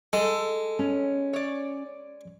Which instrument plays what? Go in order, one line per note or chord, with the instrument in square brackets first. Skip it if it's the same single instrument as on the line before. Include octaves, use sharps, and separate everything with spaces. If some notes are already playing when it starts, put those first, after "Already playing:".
[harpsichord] G#3 [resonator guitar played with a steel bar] A4
[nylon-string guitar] C#4
[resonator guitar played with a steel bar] C#5 D5